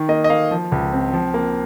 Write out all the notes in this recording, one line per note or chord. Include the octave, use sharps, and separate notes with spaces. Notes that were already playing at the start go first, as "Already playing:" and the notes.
Already playing: D#3
A#3 D#5
D#5
A#3 F5
F3
C#2
C4
F3
A#3